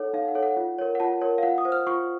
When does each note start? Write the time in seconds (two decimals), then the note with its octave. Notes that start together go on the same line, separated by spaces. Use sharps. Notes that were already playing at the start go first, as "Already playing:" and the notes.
Already playing: D#4 A4 C#5 F#5
0.14 D#4 F5
0.28 F#5
0.35 A4 C#5
0.43 F#5
0.57 F4
0.79 A#4 C#5
0.95 F#5
1.00 F4 A5
1.21 A#4 C#5
1.38 F5
1.43 F4 F#5
1.58 D#6
1.65 C5
1.72 F6
1.87 F4 C#6